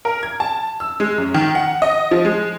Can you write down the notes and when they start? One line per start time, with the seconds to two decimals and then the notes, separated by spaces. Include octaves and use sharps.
0.05 A#4
0.23 G#6
0.40 A5
0.80 E6
1.00 G#3
1.18 F#2
1.34 D#3
1.55 F#5
1.82 D#5
2.11 F3
2.25 G#3